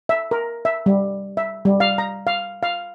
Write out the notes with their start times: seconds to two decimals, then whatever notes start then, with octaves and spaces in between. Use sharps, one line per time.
0.09 E5
0.31 A#4
0.65 E5
0.86 G3
1.37 E5
1.65 G3
1.80 F5
1.98 A#5
2.27 F5
2.63 F5